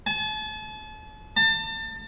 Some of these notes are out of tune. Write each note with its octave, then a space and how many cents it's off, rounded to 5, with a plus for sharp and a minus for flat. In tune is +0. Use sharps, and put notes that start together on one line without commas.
A5 -40
A5 +30